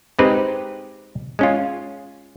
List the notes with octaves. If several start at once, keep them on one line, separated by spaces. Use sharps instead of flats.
G#3 C4 D#4 G4 B4
G#3 C#4 F4